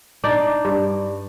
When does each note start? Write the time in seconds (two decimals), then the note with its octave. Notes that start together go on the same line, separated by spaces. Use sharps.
0.24 D4 D#4 D5
0.65 G2